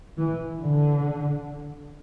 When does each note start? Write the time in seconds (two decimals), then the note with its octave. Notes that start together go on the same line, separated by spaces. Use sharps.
0.17 E3
0.60 D3